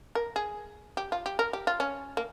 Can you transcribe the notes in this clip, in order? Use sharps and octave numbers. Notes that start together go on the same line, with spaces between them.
A#4
G#4
G4
F4
G4
A#4
G4
F4
C#4
A#3